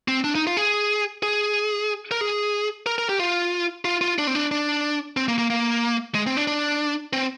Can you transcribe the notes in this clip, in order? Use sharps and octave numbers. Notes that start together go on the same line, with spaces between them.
C4
D4
D#4
F4
G#4
G#4
A#4
G#4
A#4
A#4
G4
F4
F4
F4
D4
C4
D4
D4
C4
A#3
A#3
A#3
G#3
C4
D4
D4
C4